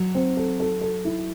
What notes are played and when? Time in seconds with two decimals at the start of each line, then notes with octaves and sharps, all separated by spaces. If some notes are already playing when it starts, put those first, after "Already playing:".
Already playing: F#3
0.15 C4
0.37 A4
0.60 A4
0.81 A4
1.05 E4